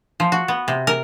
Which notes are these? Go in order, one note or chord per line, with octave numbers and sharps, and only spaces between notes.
F3
F#4
B3
C3
A#4